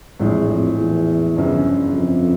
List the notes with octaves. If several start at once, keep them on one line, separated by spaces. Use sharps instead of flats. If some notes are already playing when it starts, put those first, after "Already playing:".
A#1 F2 A2 E3 G#3
F2
E2
G1 F#2 C#3 F3
F2